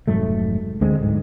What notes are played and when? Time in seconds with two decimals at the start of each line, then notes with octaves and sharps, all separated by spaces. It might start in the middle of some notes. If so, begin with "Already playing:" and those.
0.08 F1 G#2 F#3 A3
0.81 D2 D3 G#3 C4
0.99 D1 D2 G#2